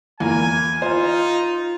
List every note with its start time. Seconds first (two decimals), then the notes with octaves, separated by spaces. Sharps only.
0.20 E2 A#3 G#5
0.82 D#4 F4 C5